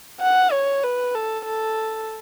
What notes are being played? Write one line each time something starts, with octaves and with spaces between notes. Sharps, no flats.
F#5
C#5
B4
A4
A4